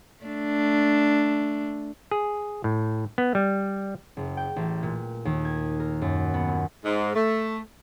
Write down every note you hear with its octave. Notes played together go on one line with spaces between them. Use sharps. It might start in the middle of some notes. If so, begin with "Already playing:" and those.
A3 D4
G#4
A2
B3
G3
F#1
G5
A1
A#2
D#2
G#6
A#4
F#2
B3
A#2
G#2
A3